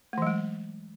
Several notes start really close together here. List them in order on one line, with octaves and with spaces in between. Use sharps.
A3 E3 F#3 G#3